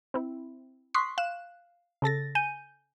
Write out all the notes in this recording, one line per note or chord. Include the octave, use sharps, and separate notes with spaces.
C4 E4
C6 C#6 D#6 F#6 B6 C7
F5 F#6 E7
C#3 A4 A6 A#6
G#5 G6 D#7